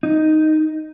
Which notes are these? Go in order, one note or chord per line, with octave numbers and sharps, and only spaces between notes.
D#4